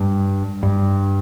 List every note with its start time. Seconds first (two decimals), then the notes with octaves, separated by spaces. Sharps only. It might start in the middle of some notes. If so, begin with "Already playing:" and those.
Already playing: G2
0.63 G2